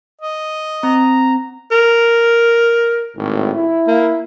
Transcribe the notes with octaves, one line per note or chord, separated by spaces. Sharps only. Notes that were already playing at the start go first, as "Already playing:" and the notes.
D#5
C4 A#5
A#4
G#1 A2
E4
A#3